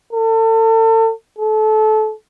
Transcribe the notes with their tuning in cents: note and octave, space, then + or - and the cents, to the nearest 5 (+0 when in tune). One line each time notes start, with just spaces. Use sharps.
A4 +35
A4 -25